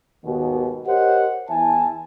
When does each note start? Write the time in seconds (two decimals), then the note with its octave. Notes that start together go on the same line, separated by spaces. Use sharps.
0.24 D#2 G#2 B2
0.85 G4 A#4 C5 C#5 D#5 F#5
1.49 E2 E4 E5 G#5 A5